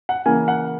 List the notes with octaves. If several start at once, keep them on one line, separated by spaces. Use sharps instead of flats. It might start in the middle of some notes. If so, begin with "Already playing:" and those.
F#5
C#3 E3 A#3 G#5
F#5